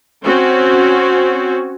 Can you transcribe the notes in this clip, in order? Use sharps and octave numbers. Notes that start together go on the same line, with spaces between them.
C4 C#4 F#4